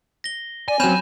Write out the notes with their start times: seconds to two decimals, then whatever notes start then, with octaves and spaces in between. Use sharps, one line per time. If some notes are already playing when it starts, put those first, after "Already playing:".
0.24 A#6 G7
0.68 D5 G#5
0.80 F#3 C4 C#4 B5 G6 E7